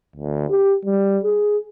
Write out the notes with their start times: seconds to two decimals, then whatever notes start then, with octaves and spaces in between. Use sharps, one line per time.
0.16 D2
0.50 G4
0.86 G3
1.24 G#4